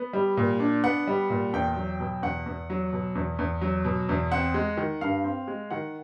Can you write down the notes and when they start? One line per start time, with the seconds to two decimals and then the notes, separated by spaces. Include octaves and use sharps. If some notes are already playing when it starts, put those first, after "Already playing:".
Already playing: B3
0.13 G3
0.37 A#2
0.60 D4
0.84 B3 F#5
1.07 G3
1.30 A#2
1.53 E2 G5
1.76 F#3
2.00 B2
2.22 E2 F#5
2.46 E2
2.70 F#3
2.93 B2
3.15 E2
3.39 E2
3.61 F#3
3.85 B2
4.09 E2
4.32 C4 F#5
4.54 G#3
4.77 D#3
5.01 G2 F5
5.24 C4
5.47 G#3
5.70 D#3 F#5